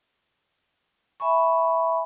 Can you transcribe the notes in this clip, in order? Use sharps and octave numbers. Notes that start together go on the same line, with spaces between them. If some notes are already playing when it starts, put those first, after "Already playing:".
E5 G#5 B5 C#6